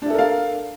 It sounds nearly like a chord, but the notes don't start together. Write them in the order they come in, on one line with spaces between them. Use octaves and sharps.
D4 E5 A4 A#4 F5